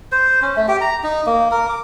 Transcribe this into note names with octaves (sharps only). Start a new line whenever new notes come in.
C5
C#4
A3
G4
A#5
D#4
A#3
A#4
D6